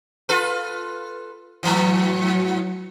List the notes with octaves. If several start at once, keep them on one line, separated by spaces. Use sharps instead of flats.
F4 A4 B4
G#2 E3 F#3 C#7